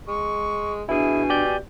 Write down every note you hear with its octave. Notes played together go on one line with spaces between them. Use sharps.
G#3 C#6
B2 D4 E4 G#4 G#5
G4 D5 G6